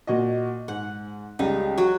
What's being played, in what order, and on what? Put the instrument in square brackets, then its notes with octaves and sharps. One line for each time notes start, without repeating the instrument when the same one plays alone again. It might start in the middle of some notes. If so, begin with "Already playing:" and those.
[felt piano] A#2 F#4 D#5
[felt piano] G#2 [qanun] F#5
[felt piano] C#2 G3 [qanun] D#4
[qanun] F#3 F#4